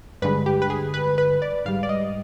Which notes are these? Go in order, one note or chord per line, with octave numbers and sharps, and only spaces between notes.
G2 D3 G#3 B4
G4
B4
G#4
B4
B4
D5
G#2 G3 F5
D5
D#5